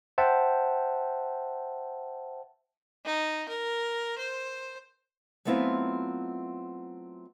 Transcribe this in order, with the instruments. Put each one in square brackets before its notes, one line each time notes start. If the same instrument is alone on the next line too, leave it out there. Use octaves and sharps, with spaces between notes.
[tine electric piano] C5 E5 F#5 G5 A5
[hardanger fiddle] D#4
A#4
C5
[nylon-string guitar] F#3 A3 B3 C4 E4 F4